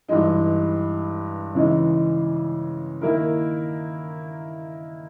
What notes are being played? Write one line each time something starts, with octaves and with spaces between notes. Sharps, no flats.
G2 E3 G#3 D#4
C#3 E3 G#3 D#4
D#3 A#3 E4 A#4